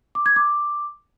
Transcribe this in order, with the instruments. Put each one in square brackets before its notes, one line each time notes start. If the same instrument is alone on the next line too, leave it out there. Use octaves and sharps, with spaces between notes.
[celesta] D6
G#6
D6